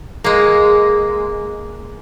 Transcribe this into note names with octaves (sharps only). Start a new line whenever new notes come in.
G#3 A#3